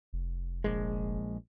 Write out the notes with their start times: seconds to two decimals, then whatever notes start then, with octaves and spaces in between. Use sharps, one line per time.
0.13 F1
0.64 A#1 G#3